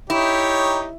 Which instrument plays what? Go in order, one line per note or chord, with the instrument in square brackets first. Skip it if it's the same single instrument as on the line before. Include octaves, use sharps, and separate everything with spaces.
[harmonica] D#4 G4 C#5 [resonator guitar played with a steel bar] E4